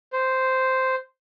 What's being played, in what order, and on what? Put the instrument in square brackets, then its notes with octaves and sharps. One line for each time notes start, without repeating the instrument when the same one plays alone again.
[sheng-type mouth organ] C5